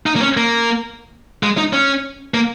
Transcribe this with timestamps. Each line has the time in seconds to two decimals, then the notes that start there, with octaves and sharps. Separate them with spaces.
0.06 D#4
0.16 A#3
0.22 C#4
0.37 A#3
1.43 G#3
1.57 D#4
1.73 C#4
2.34 A#3